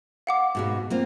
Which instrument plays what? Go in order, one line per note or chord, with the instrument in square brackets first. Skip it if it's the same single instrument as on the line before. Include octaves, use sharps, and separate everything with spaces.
[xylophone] F5 F#5 D6
[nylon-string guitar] G#2 B2 G#3
A#3 C4 F4